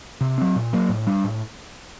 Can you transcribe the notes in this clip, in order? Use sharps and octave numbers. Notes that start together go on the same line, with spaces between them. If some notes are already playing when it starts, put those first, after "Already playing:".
C3
F#3 C4
A#2
F#3 A#3
A2
G3 D4
A2